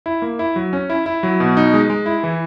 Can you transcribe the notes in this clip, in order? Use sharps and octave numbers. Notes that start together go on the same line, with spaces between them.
E4
A#3
E4
F#3
C#4
E4
E4
F#3
B2
D#4
G#3
G#3
E4
E3